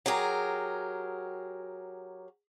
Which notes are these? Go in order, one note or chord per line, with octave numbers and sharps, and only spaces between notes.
F#3 G4 G#4 A#4